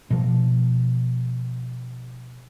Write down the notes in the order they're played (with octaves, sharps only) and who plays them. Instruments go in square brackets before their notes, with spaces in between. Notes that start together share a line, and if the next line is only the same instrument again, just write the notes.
[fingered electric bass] B2 F3